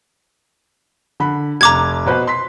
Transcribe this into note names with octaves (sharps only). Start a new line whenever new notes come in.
D3 B5
F1 A#5 D6 G#6
B2 B4 C5
C6 B6